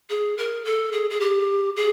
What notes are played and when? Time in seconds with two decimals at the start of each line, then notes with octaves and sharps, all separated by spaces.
0.09 G#4
0.37 A#4
0.65 A4
0.92 G#4
1.10 G#4
1.20 G4
1.76 G#4